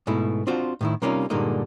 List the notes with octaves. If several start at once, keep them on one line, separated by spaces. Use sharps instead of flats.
G#2 B2 A3 E4
C4 D4 F4 F#4 C5
A2 D#3 E4
C3 G3 A#3 C#4 D#4 F4
G2 A#2 D3 G#3 A#3 D#4